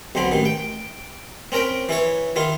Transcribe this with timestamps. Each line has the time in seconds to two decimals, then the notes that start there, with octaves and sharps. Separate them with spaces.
0.15 B1 D3 C4 B5
0.32 A1 D#3
0.45 G5
1.52 C4 C#4 A#4 G5 B5
1.89 E3 E4 C#5
2.36 D#3 E4 F4